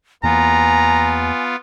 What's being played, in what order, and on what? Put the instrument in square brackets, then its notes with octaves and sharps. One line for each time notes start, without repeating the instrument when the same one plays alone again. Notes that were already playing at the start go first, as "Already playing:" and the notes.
[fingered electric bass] E2 E3 A#3 [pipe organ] B3 F4 [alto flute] G#5 [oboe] A#5